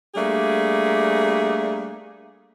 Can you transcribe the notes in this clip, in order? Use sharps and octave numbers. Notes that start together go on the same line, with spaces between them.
G3 A3 A#3 D4 G#4